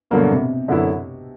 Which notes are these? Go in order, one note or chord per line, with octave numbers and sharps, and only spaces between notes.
G2 B2 D3 F#3 A#3
C3
F#2 D3 F#3 B3 E4